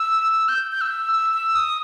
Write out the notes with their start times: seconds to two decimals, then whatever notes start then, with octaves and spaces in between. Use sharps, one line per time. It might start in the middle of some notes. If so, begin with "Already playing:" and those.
Already playing: E6
0.48 G6
0.72 G6
0.81 E6
1.12 E6
1.33 E6
1.55 D#6